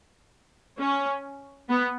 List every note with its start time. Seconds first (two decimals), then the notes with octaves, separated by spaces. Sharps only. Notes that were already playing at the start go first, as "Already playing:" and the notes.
0.79 C#4
1.69 B3